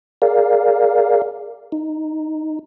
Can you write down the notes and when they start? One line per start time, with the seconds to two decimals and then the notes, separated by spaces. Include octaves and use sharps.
0.22 G#4 A#4 D5 F5
1.72 D#4